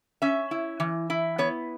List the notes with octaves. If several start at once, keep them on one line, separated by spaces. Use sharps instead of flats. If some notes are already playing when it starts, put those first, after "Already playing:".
C#4 E5
E4
E3
E4
B3 C#5